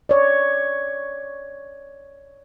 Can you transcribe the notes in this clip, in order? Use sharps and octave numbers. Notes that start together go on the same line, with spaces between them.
C#5 D5